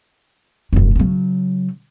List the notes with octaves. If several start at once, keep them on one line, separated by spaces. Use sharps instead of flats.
F1 F#2
C#3 F#3